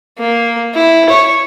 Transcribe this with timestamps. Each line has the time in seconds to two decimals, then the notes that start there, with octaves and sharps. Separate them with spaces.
0.18 A#3
0.74 E4
1.09 C#5